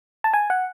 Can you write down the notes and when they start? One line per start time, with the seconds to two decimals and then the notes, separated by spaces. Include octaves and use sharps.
0.24 A5
0.33 G#5
0.50 F#5